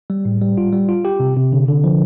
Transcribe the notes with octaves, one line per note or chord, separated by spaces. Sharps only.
G3
A2
G3
F4
G3
F4
G4
C3
C3
D3
D3
F3